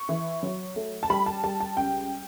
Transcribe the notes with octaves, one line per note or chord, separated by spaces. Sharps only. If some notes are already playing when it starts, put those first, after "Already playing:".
Already playing: C#6
E3
F#3
A3
A5
G3 B5
A5
G3 A5
A5
C#2 G5